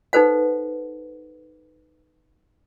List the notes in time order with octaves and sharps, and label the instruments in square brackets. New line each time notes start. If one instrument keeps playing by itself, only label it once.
[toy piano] D#4 A4 B4 C5 F#5